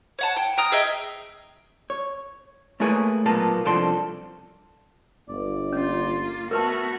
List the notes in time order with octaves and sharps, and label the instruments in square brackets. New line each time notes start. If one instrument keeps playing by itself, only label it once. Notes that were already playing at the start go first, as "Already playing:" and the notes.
[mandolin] C#5 F#5 A5
G5
G5 A#5 D#6 F6
G#4 D#5 E5 G5
[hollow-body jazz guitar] C#5
A3 A#3 E4 G#4 B4 C#5
B1 A#2 A#3 B3 A5
C2 F3 D4 A4 C6
[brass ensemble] G1 [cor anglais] D5
[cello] A#3 F4 [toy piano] C#4
[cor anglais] A3 [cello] B3 F#4 [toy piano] A#4 B4 A5